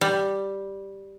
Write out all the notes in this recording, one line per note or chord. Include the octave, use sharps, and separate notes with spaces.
G3